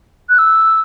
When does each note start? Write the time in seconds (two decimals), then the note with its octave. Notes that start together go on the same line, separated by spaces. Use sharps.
0.29 F#6
0.38 E6